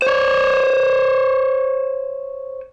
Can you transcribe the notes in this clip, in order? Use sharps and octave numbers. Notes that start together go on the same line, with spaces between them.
C5 C#5